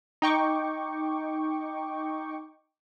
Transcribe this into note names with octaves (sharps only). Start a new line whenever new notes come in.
D#4 G5 C#6 D6